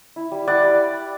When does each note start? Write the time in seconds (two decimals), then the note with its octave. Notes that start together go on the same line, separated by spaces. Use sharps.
0.16 E4
0.31 G3
0.47 E4 D5 F#5
0.63 G3